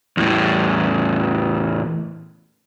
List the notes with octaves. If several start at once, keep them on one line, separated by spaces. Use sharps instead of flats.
E2 A2